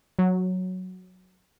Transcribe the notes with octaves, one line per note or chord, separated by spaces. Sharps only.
F#3